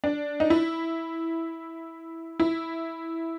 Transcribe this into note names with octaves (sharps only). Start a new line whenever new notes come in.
D4
D#4
E4
E4